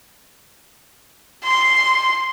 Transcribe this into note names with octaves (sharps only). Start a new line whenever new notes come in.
C6